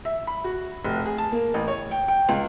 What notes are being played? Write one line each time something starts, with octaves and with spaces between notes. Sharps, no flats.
E5
B5
F#4
F1
G#4
A5
A#3
A1
C#5
G5
G5
C#2